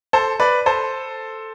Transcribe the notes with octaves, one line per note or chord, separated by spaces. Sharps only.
A4 C5
B4 D5
A4 C5